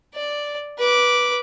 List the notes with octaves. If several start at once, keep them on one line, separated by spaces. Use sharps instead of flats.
D5
B4 D6